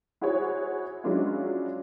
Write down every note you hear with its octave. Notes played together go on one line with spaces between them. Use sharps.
E4 F#4 G#4 C5 C#5
F#3 G#3 C#4 D4 E4 F4